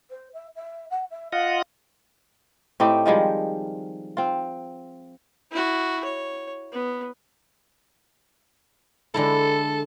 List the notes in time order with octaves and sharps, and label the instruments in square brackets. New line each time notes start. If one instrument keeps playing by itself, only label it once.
[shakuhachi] C5
E5
E5
F#5
E5
[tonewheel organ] F4 D#5 F#5 [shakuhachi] F5
[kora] A2 C4 D#4 G4
D#3 F3 G3 G#3
C4 F4
[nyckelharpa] E4 F#4
C#5
B3
[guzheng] D3 G#3 E4 [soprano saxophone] A4